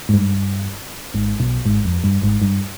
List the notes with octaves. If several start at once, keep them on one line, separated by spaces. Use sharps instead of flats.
G#2
G2
G#1 G#2
B1 B2
G#1 G#2
F2
G2
G#1 G#2
G2